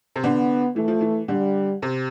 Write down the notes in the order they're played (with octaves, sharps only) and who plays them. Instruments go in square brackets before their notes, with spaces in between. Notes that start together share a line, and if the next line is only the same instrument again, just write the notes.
[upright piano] C3
[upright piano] D3 [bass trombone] B3
[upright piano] E3 [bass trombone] A3
[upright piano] F3
E3
[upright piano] D3 [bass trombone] G3
[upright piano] C3